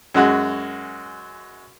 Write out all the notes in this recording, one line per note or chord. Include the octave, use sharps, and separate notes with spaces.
F#2 G#3 F#4